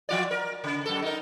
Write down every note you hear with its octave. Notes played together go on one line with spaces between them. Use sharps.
F3 F4 D5
A#4
C#3
F#2 A4
D#4 A#4